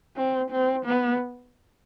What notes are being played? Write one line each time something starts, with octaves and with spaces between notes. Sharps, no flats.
C4
C4
B3